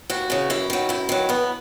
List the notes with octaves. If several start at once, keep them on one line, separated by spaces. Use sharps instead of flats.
D#2 F#4
C#3 E3
F#2 E4
D#3 F#3
F#2 E4
D#3 F#3
E2 B3